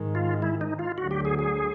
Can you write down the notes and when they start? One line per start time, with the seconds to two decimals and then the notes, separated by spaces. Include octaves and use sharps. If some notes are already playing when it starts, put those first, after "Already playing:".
Already playing: G#2 D#3 G#3
0.15 F4
0.42 E4
0.61 D#4
0.79 F4
0.97 D2 D3 F#3 F#4
1.11 G4
1.25 G#4
1.39 G#4